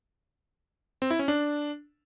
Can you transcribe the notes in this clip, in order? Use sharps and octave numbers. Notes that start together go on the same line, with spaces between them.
C4
E4
C#4
D4